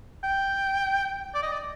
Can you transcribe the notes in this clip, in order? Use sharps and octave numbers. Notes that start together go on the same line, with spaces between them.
G5
D5
D#5
D5